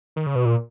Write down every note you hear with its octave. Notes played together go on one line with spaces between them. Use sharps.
D#3
C#3
B2
A#2